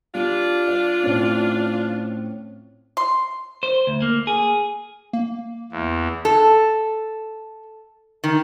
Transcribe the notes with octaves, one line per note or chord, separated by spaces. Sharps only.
G3 D4 F4
D5
A2 C4 C#4
C6
C5
D2
A#3
G#4
A#3
E2
A4
D#3